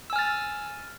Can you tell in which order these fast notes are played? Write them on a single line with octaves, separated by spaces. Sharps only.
E6 G#5 F6 A6